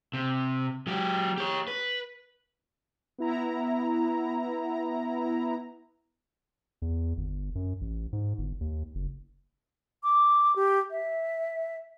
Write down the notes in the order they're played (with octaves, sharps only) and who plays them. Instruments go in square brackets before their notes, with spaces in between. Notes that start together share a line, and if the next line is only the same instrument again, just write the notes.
[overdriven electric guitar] C3
F#3 G4
G4 C#5
B4
[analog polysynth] B3 E4 A#5
[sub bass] E2
G1
F#2
A1
G#2
G1
D#2
F#1
[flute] D6
G4
E5